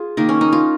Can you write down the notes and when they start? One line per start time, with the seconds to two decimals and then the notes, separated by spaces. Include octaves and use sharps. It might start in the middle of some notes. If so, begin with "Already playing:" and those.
Already playing: F4 G#4
0.17 D#3 A#3 D#4
0.29 C#4
0.41 D#4
0.52 F4